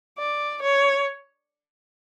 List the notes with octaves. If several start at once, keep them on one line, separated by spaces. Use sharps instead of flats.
D5
C#5